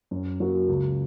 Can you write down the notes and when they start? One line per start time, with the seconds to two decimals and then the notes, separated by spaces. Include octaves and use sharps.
0.11 F#2
0.40 F#3 A#3 F#4
0.69 C#2